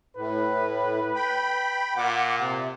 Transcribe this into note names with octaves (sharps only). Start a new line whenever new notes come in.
A2 B4
G5 B5
A#2 F#5 D6
C3